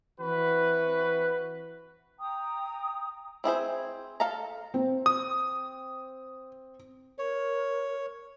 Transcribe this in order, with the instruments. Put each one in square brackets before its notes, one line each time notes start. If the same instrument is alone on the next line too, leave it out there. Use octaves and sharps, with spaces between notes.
[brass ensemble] E3 C4 E4 F#4 B4
[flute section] G5 A#5 D#6
[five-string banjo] C4 E4 G#4 C5
A4 F5 A5 A#5
[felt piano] C4
[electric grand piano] D#6
[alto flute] A#4 [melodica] C#5